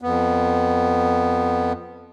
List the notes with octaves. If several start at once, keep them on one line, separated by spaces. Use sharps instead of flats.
F2 B3